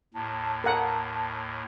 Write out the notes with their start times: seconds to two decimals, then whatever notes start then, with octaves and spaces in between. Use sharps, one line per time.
0.14 D#2 A2 A5
0.64 A#4 F#5 A5